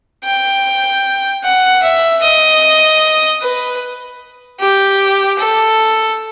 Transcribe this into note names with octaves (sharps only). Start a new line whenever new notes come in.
G5
F#5
E5
D#5
B4
G4
A4